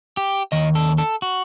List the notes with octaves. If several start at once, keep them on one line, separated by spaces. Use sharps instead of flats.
G4
D#2 D#3 D#5
A4
A4
F#4